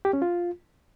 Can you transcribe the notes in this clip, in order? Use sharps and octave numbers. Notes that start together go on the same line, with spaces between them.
G4
C#4
F4